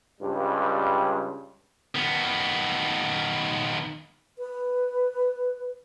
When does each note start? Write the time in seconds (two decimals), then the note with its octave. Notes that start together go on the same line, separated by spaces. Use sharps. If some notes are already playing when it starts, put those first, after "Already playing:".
0.21 C#2 G2 G3
1.95 D#3 B3
4.38 B4